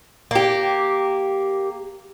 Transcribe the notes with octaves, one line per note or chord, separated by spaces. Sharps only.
A#3 G4